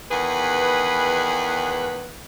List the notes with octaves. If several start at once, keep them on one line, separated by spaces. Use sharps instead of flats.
E2 D#3 G#4 B4